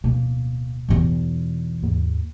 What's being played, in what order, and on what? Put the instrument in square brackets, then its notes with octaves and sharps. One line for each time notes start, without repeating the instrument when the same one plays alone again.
[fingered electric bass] D1 B2 [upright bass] A#3
[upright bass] B1 E2
[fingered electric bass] D#2 G#2 A#3